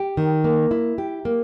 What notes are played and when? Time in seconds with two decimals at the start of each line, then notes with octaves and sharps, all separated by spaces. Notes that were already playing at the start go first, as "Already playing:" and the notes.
Already playing: G4
0.17 D#3
0.44 A#3
0.71 E4
0.98 G4
1.25 A#3